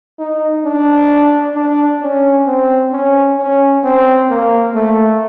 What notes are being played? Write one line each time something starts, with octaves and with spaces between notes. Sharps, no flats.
D#4
D4
D4
C#4
C4
C#4
C#4
C4
A#3
A3